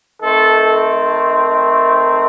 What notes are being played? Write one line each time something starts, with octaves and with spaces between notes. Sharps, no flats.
D#3 A3 C4 A4